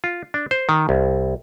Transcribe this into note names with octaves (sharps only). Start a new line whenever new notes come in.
F4
D4
C5
D#3
C2